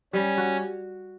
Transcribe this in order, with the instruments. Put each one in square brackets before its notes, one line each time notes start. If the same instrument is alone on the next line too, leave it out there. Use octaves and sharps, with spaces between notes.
[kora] G3 [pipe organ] C#4
[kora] F#4